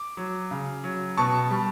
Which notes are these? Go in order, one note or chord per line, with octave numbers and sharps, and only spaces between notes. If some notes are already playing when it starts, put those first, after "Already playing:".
Already playing: D6
F#3
C#3
F#3
B2 A5 C#6
G3